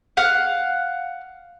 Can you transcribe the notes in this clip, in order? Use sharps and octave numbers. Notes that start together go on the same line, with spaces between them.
F5 F#5